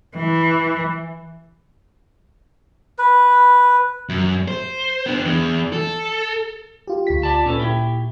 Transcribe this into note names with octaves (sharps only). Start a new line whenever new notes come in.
E3
B4
F#2
C5
B3 D4
E2
A4
F4 G4
D2 F4 B6
D5 A5
A#2 C#4 A4 B4
E4 G4